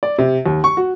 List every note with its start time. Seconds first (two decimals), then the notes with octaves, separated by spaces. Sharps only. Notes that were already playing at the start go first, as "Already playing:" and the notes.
0.03 D5
0.18 C3
0.46 D#2
0.64 C#6
0.77 F#4